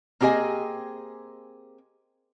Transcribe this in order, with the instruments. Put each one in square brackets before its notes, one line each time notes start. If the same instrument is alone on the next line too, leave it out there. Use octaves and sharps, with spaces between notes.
[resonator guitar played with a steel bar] A#3 C4 G4 G#4 D#5 G#5